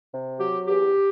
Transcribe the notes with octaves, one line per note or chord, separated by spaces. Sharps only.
C3
F#3 G4
E2 G4